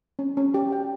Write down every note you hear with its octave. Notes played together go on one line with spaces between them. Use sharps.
C#4
C#4
G4
G5